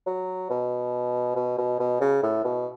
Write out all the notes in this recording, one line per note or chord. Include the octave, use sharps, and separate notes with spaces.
F#3
B2
B2
B2
B2
C#3
A2
B2